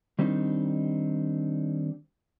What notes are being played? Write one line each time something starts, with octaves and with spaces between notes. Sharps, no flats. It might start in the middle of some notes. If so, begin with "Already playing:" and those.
D#3 G3 C4 D4 D#4